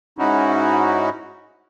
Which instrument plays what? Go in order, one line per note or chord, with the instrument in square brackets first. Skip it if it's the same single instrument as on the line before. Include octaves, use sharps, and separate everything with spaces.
[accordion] G#2 C#4 D#4 E4 F#4